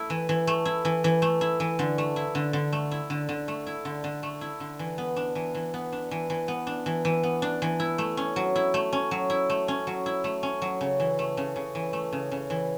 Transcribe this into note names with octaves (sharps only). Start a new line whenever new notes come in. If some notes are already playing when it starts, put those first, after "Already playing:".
Already playing: A3 E4
E3
E3
A3
E4
E3
E3
A3
E4
E3
D3
A3
E4
D3
D3
A3
E4
D3
D3
A3
E4
D3
D3
A3
E4
D3
E3
B3
D4
E3
E3
B3
D4
E3
E3
B3
D4
E3
E3
B3
D4
E3
E4
A3
C#4
F#3
E4
A3
C#4
F#3
E4
A3
C#4
F#3
E4
A3
C#4
F#3
C#3
E3
A3
C#3
C#3
E3
A3
C#3
C#3
E3